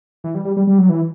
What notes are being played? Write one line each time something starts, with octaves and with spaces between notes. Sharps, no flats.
E3
G3
G3
G3
G3
F#3
E3